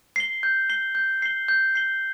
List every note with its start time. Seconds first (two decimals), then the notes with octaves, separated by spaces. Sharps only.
0.16 C7 G7
0.43 G6
0.70 C7 G7
0.95 G6
1.22 C7 G7
1.48 G6
1.75 C7 G7